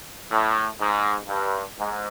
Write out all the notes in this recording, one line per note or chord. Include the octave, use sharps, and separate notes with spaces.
A2
G#2
G2
G#2